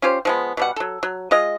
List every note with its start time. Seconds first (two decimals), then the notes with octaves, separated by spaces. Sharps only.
0.02 C#4 F4 G4 C5
0.25 F3 G#3 B3
0.57 B2 G3 F#5
0.76 F#3 A4
1.03 F#3
1.31 G#3 F4 D#5